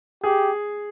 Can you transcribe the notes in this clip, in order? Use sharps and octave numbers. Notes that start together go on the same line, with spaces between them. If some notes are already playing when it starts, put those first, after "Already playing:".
G4 G#4